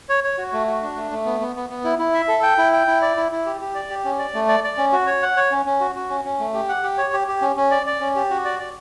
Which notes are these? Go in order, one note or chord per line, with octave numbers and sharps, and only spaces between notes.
C#5
C#5
F#4
A3
F#4
D4
A3
A3
B3
B3
B3
B3
E4
E4
E5
A4
G5
E4
G5
E4
D5
E4
E4
G4
G4
D5
G4
C#4
D5
A3
D5
D5
C#4
F#4
C#5
F#5
C#5
C#4
C#4
F#4
F#4
C#4
C#4
A3
G4
F#5
G4
C#5
G4
G4
C#4
C#4
D5
D5
C#4
G4
F#4
D5
D5